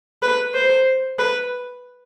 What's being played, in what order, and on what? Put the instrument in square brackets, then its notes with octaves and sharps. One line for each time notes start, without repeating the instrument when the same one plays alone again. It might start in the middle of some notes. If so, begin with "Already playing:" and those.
[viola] B4
C5
B4